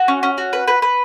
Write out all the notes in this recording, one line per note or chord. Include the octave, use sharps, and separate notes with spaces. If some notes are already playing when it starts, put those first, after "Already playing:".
Already playing: F#4
C#4
C#4
F#4
B4
B4
B4